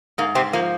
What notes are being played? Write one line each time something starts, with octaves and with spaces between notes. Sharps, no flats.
G#2 A#3
C3 C4
F3 A#3